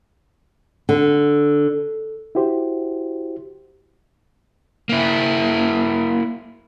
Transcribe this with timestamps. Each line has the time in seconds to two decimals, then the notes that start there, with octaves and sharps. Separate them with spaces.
0.89 D3
2.35 E4 F#4 G4 C5
4.89 A#3 E4